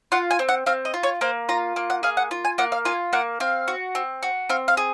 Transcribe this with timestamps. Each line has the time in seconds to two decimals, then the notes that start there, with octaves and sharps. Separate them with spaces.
0.12 F4 F#5
0.31 G#5
0.39 C4
0.49 F#5
0.66 C4 F5
0.85 D#5
0.94 F4
1.03 C#5
1.21 A#3 C5
1.49 F4 A#5
1.76 A#3
1.90 F#5
2.03 G#4 F5
2.17 F#5
2.31 F4
2.45 G#5
2.58 A#3 F#5
2.72 F5
2.85 F4 G#5
3.13 A#3 F#5
3.40 C4 F5
3.68 F#4
3.95 C4
4.23 F#4
4.49 C4 F5
4.68 F5
4.77 G#4